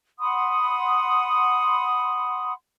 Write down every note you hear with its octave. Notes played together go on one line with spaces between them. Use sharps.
F#5 B5 C6 D#6